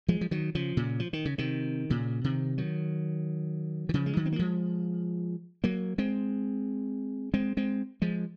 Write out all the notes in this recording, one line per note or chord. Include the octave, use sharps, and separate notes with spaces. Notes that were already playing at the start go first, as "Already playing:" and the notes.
F3 G#3
F3
D#3 F#3
C#3 F3
A#2 C#3
F3
D#3
C#3
C3 D#3
A#2 C#3
C3 D#3
D#3 F#3
D#3
C#3 F3
G#3
D#3 F#3
C4
A#3
F3 G#3
F#3 A#3
G#3 C4
G#3 C4
G#3 C4
F3 G#3